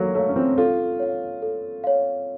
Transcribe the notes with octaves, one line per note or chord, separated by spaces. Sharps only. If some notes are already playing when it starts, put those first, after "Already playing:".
Already playing: F#3 A#3 A4
A3 C#5 F5
C#4
C4
F4 A4
C#5 F5
A4
C#5 F5